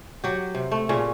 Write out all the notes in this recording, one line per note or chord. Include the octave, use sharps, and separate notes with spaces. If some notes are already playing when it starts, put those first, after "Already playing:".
F#3 G4
C3
A3
A#2 C#3 C#4